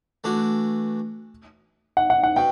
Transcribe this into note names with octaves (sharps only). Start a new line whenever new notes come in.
E3 A3 D4 F#4
F#5
F#5
F#5
B2 G5